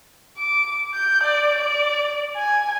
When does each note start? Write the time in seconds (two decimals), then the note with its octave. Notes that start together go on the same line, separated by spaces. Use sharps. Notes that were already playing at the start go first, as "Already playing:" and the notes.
0.38 D6
0.94 G6
1.23 D5
1.58 D5
2.37 G#5